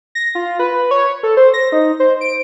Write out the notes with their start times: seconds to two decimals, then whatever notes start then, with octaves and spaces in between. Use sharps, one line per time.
0.15 A#6
0.35 F4
0.59 B4
0.91 C#5
1.23 A4
1.37 C5
1.54 A#6
1.72 D#4
2.00 C5
2.21 D7